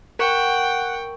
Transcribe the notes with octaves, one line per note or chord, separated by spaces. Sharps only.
A#4 F#5 G5 C#6